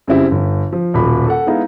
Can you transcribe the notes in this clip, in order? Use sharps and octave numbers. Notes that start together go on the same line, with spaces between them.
F#2 C#3 G3 C4 E4
G1
F3
D#1 B1 B5
A4 F#5
G#3 B3 D#4 E4 F5